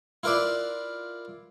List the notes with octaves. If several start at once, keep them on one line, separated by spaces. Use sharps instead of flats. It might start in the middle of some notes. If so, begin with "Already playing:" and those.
E4 F4 A#4 B4 D5 E5